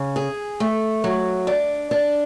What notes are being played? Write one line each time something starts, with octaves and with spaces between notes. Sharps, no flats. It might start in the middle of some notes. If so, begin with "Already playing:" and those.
Already playing: C#3
G#4
A3
F#3
D4
D4